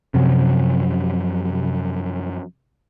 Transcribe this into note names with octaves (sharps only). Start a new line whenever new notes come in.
F#2 C3 F3 F#3